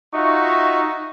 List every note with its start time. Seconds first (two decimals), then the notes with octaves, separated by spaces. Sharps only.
0.14 D#4 F4 F#4 E5 C#6